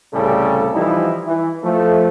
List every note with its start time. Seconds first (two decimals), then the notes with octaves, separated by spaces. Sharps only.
0.13 C2 A2 C#3 G3 G#4 A4
0.74 E3 F3 G3 D#4 E4
1.26 E3
1.63 F3 A3